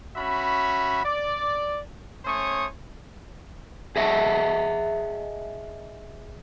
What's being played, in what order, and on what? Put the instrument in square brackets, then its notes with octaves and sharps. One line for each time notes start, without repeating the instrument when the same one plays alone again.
[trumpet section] C#4 F#4 E5 B5
D5
A3 C#4 C5 C#5 C#6 D#6
[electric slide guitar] G#4 D#5 E5 F#5 A5